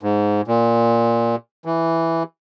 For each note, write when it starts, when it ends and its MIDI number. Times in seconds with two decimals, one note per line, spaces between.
0.03 0.41 44
0.48 1.36 46
1.65 2.23 52